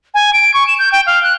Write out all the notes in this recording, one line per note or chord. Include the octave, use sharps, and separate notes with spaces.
G#5
D7
C#6
E7
G6
G5
F5
F#6